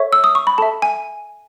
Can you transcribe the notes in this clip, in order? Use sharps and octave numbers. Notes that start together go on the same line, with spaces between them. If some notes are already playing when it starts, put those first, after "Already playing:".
Already playing: A4 C#5 E5 C#6
E6
D#6
C#6
B5
A4 E5 A5
G#5